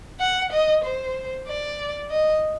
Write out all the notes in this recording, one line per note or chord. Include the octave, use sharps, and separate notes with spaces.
F#5
D#5
C5
D5
D#5